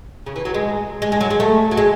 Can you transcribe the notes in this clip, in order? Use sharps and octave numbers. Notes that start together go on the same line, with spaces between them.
C#3
E3
F#3
G#3
G#3
G#3
F#3
G#3
A3
F#3
G#3